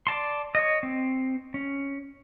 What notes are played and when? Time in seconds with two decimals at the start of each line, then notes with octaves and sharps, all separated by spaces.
0.07 D5 A5 C6
0.55 C#5 D#5
0.83 C4
1.54 C#4